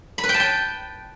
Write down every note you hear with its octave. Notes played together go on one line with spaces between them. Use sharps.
B5
B4
G5
A5
G5